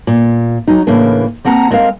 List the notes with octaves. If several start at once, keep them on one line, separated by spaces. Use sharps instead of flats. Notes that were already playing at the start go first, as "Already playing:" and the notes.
A#2
F#3 D#4
A2 C#3 E3 A#3 D4
A#3 C4 F#5 A5 A#5
G#3 C4 A#4 D#5 F5